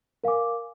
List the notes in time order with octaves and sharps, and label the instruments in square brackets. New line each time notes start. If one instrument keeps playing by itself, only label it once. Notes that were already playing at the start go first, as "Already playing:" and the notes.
[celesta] A#4 F5 G#5 D6